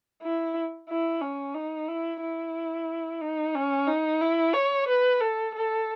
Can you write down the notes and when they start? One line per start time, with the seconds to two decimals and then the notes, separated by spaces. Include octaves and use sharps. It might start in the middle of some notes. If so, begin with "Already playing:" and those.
0.23 E4
0.89 E4
1.21 C#4
1.54 D#4
1.88 E4
2.21 E4
3.21 D#4
3.55 C#4
3.87 D#4
4.21 E4
4.54 C#5
4.88 B4
5.21 A4
5.55 A4